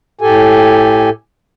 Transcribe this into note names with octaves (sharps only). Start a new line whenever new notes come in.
A2 G4 A4 G#5